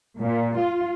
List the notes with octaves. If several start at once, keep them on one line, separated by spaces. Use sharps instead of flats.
A#2
F4